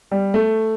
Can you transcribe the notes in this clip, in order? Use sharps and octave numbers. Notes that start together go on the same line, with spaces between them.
G3
A3